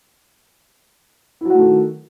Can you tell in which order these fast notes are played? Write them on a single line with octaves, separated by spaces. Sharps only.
E4 F#3 F#4 A3 D#3